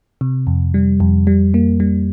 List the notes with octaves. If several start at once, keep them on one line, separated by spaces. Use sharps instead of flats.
C3
F2
G3
F2
G3
A#3
G3